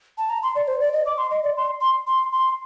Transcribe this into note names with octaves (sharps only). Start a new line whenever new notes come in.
A5
A#5
C6
D5
C5
D5
D#5
D6
C6
D#5
D5
C6
C6
C6
C6